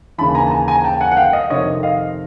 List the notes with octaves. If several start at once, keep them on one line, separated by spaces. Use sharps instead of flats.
D#2 C#3 E3 A5 B5
G#5 A#5
A5
G#5 A#5
G#5 A#5
G5 A5
F#5 G#5
F#5
F5 G5
D#5 F5
F2 C3 D#3 C#5 D#5
D#5 F5